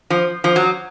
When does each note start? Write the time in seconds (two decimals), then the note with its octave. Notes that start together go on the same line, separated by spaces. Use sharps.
0.10 F3
0.44 F3
0.56 F#3